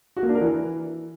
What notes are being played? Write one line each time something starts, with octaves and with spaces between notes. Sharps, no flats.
F#4
A#3
D4
A#4
E3